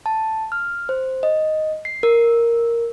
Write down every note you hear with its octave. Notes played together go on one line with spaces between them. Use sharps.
A5
F6
C5
D#5
C7
A#4